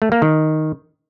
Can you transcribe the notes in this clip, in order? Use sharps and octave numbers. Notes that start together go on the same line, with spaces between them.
A3
A#3
D#3